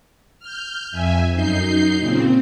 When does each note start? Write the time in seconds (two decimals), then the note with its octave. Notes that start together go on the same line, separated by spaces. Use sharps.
0.39 F6 G6
0.91 F2 E5 G#5
1.34 F#2 D#4 G6 C7
1.99 A#2 C#3 C4